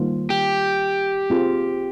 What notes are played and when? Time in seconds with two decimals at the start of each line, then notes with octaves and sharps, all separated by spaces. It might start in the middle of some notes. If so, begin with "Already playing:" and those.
Already playing: D#3 G3 A#3 F4 C5
0.30 G4
1.30 C4 F4 G#4